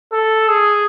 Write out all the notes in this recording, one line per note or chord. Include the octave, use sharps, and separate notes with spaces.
A4
G#4